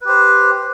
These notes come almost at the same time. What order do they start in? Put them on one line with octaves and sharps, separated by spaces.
B4 G4 C5